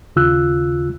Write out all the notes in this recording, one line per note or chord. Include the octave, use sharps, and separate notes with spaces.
D#2 C#3 F4 E6 F#6